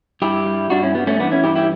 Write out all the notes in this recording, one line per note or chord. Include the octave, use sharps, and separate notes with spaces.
G2 E4 G4
G3
G2 D4 F#4
C#4 E4
G3 B3
A3 C#4
E3 B3 D4
C#4 E4
G2 E4 G4
E4 G4